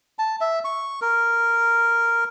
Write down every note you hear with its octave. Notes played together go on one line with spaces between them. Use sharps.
A5
E5
C#6
A#4